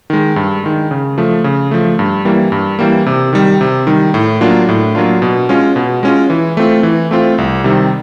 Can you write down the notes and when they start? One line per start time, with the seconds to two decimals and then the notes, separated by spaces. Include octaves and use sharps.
0.10 D#3 G#3
0.36 G2
0.64 D#3 G#3
0.91 C#3
1.18 F3 A3
1.44 C#3
1.71 F3 A3
1.99 G2
2.25 E3 G3 A#3
2.52 G2
2.79 E3 G3 A#3
3.06 C3
3.33 D#3 G3
3.61 C3
3.87 D#3 G3
4.14 A2
4.41 F#3 A#3 D4 F4
4.69 A2
4.95 F#3 A#3 D4 F4
5.22 B2
5.49 G#3 C#4 F4
5.76 B2
6.03 G#3 C#4 F4
6.30 E3
6.57 A3 C4 F4
6.83 E3
7.11 A3 C4 F4
7.38 C2
7.64 C3 D#3 G3